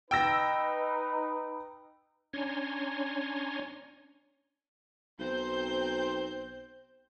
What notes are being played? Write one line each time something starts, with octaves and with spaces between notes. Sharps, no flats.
D#4 B4 G5 E6 A#6
C#4 D4 C#5 G#5 A#5 C6
B1 C4 C5 G6